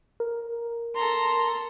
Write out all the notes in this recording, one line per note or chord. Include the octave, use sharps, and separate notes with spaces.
A#4
A4 A#5 C6